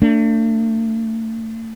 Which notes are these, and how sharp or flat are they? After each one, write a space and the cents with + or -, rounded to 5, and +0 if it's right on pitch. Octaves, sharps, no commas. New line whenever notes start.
A3 +35 D4 -5